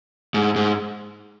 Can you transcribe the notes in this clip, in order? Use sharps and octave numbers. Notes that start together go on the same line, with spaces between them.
G#2
G#2